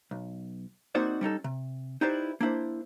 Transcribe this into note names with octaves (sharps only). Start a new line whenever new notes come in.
B1
A#3 C4 D#4 F#4 C5 D5
G3 C#4 D#4 A4
C3
D#4 E4 G4 B4 C5 D5
A#3 D4 E4 C5